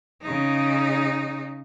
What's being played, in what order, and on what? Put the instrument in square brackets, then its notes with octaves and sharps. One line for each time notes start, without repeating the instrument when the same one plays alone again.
[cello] C#3 D#4